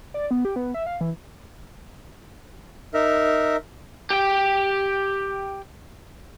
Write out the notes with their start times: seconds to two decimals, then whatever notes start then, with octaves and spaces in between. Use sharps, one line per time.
0.14 D5
0.31 B3
0.45 G4
0.56 B3
0.74 E5
0.86 F5
1.01 E3
2.94 D#4 A#4 E5
4.10 G4 G5